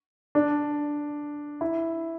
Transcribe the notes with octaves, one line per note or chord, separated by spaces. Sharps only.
D4
E4